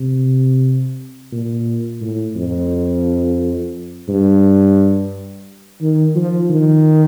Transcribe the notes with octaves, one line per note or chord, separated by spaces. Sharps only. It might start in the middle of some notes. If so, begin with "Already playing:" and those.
Already playing: C3
A#2
A2
F2
G2
D#3
F3
D#3